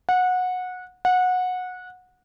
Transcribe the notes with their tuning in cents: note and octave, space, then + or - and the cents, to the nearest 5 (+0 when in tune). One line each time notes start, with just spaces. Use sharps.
F#5 -20
F#5 -20